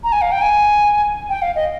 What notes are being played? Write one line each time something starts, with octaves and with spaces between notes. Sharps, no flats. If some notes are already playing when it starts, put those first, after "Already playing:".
A#5
G#5
F5
G5
G#5
G5
F5
D#5